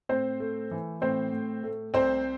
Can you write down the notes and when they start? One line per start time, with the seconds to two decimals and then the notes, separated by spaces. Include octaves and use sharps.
0.09 A2 C4 C5
0.40 A3
0.71 E3
1.01 A2 C4 C5
1.33 A2
1.63 A3
1.94 C2 C4 C5